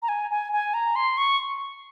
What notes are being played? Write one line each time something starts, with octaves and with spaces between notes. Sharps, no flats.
A#5
G#5
G#5
G#5
A#5
C6
C#6